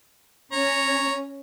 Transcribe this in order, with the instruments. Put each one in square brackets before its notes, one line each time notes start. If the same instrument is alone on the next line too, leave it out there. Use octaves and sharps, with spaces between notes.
[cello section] C#4 [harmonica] C#5 A#5